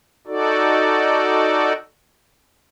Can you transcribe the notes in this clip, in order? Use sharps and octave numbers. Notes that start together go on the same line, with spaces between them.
D#4 F#4 A4 D5